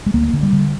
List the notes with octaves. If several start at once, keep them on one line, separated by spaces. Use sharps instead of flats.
G#3
D2 A#3
D3
G3
D3